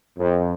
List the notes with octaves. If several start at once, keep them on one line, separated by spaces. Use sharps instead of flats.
F2